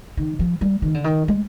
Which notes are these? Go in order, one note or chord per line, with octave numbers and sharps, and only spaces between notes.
D#3
F3
G3
D#3
D3
D#3
G#3